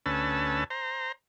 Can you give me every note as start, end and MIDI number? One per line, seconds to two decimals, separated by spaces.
0.06 0.64 38
0.06 0.64 61
0.06 0.64 71
0.06 0.64 81
0.06 0.64 88
0.70 1.12 72
0.70 1.12 82